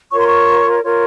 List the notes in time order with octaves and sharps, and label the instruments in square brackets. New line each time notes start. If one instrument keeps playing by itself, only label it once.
[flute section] F4 A#4 C#5 C#6
C6
C#6
F4 A#4 C#5